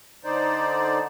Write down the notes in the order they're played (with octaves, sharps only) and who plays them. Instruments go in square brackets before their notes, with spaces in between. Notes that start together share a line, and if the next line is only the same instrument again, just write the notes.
[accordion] D3 D#4 C5 D5